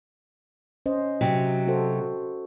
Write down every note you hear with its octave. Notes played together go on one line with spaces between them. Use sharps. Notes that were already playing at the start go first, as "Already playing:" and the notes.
C#4 C5 D#5
C3 F#3
F#4 A4 C5